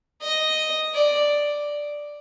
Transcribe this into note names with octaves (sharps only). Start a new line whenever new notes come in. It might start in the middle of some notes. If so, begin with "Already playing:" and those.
D#5
D5